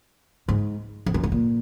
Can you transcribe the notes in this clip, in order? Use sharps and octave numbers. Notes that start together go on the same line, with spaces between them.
G#2
F2
F#2
G#2
A#2